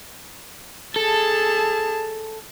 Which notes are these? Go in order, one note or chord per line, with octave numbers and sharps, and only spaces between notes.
G#4 A4 A5